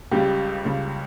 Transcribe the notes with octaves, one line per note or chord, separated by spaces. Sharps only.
C#2 C#3 G3 G4
C#2 C#3 G3